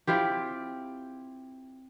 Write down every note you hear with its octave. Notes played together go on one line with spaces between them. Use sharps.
C4 E4 F4 G4